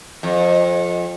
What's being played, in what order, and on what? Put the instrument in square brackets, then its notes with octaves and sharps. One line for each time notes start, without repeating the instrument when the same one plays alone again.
[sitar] F2